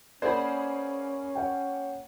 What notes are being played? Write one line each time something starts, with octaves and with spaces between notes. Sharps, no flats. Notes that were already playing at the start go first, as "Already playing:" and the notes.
A#3 C#4 G#4 C5 D5 F#5 B5
C#5 F#5 G5